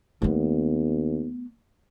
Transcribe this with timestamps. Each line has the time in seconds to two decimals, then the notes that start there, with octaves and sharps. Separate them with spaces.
0.22 D#2 A3 B3